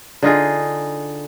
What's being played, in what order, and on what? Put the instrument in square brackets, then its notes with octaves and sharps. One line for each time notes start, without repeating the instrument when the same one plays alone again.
[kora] D3 D#4 F4 G#4